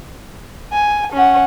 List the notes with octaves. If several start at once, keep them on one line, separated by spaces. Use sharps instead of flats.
G#5
C#4 F#5